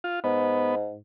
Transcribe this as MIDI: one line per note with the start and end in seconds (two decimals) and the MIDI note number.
0.04 0.20 65
0.24 0.97 44
0.24 0.75 59